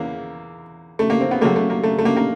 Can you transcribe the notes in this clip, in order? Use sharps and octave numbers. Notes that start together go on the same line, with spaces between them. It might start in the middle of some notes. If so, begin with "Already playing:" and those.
Already playing: E2 C#3 E3 A#3
A3
A#3
C4
B3
F#2 C#3 F#3 A3 A#3
A3
A#3
A3
A3
A#3
A#3